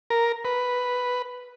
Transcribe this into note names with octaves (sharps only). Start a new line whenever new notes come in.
A#4
B4